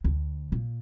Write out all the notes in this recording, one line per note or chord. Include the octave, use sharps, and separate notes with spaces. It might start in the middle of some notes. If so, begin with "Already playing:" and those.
D2
A#2